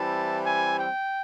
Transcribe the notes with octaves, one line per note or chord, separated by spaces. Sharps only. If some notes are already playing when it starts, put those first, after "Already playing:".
Already playing: E3 G3 C4 E4 A5
G#5
G5